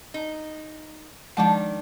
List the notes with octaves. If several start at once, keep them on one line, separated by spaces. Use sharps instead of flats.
D#4
D#3 F3 G#3 D4 F#5 A5